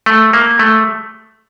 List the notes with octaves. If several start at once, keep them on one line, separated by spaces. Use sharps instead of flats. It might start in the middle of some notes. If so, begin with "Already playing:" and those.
A3
A#3
A3